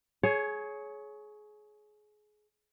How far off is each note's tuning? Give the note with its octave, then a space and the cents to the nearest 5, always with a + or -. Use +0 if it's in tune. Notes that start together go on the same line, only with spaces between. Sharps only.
G#4 +25 C#5 +0